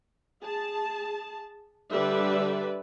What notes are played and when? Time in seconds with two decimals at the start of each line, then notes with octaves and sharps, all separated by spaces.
0.43 G#4 A5
1.92 D3 G3 B4 D5 E5